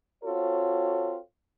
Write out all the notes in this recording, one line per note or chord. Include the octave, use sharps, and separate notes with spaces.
C4 F4 F#4 A4 C#5